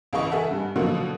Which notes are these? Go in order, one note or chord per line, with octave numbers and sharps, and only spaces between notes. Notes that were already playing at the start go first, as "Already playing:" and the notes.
C#2 C#3 E3 D#5 C#6
G#4 A4 E5 F#5 A5
G2
B2 D3 F3 F#3 A#3